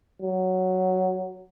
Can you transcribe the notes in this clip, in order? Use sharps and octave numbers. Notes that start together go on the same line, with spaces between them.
F#3